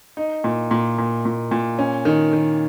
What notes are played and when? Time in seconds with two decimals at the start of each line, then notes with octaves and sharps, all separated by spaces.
0.17 D#4
0.44 A#2
0.71 A#2
0.98 A#2
1.25 A#2
1.51 A#2
1.79 C#4
2.05 D#3
2.33 D#3